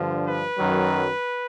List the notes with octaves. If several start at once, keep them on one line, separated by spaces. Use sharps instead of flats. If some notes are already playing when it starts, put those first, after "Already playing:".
Already playing: G2 D3 F3
B4
F#2 D#3 F#3